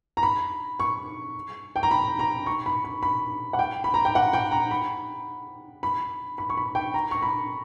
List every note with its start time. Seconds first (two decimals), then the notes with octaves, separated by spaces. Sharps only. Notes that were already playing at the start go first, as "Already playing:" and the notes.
0.17 A#5
0.23 B5
0.80 C#6
1.76 G5
1.83 A#5
1.91 B5
2.19 A#5
2.46 C#6
2.66 B5
2.84 B5
3.03 B5
3.53 F#5
3.59 G5
3.84 B5
3.94 A#5
4.05 G5
4.15 F#5
4.33 G5
4.52 A#5
4.71 B5
5.83 B5
6.38 B5
6.50 C#6
6.57 B5
6.75 G5
6.94 A#5
7.11 C#6
7.22 B5